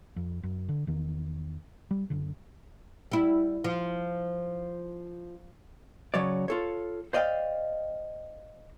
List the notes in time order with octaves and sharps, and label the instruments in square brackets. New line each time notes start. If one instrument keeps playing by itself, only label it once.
[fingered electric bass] F2
F#2
D3
E2 D#3
G3
F#1 D3
[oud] G3 E4
F3
[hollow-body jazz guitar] C#3 F#3 C#5 D5
F4 A4 C#5
C5 D5 D#5 F5 G5